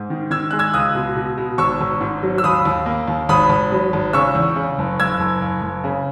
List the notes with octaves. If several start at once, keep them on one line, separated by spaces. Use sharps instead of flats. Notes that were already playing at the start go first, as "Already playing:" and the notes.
Already playing: G#2
D#3
D#3 E6 G#6
G#3 F#6
E6 G#6
C#2 D#6 F#6
B2
B2
B2
G#1 C#6 E6
G#1
G#2
F#3
E6
D#2 B5 D#6
D#2
A#3
D#2
G#1 B5 D#6
G#1
F#3
G#1
C#3 C#6 E6
E2
C#3
F#1
F#1 E6 G#6
F#1
F#1
F#1
C#3